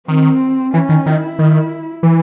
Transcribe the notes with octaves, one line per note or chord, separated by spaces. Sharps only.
D#3 C4
E3 C#4
D#3
D#3 E4
D#3
E3